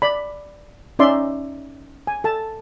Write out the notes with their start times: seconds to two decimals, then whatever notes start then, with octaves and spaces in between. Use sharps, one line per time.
0.02 D5 B5
0.99 C#4 D#4 D5 E5 C6
2.07 G#5
2.24 A4 A5